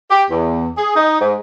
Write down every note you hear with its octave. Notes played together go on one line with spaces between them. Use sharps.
G4
E2
G#4
D#4
G#2